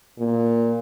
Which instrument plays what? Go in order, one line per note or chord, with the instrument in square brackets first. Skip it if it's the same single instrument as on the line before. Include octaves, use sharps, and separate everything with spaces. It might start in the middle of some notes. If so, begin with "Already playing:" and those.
[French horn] A#2